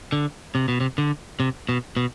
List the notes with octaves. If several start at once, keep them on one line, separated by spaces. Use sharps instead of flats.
D3
C3
B2
C3
D3
C3
B2
B2